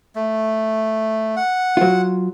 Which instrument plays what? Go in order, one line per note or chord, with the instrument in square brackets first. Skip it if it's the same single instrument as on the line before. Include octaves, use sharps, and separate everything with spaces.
[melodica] A3
F#5
[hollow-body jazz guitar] F#3 F4